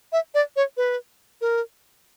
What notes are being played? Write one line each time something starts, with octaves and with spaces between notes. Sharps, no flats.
E5
D5
C#5
B4
A#4